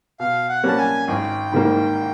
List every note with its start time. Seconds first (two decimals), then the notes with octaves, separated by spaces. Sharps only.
0.20 B2 F5
0.49 F#5
0.64 G3 A#3 C#4 A5
0.78 G#5
1.08 G#1 G5
1.52 G#2 D#3 G3 A#3